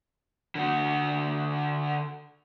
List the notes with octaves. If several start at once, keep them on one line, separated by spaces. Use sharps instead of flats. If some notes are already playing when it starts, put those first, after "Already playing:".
D3 F#4